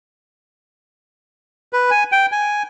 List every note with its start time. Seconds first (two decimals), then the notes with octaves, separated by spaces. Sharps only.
1.73 B4
1.91 G#5
2.12 G5
2.32 G#5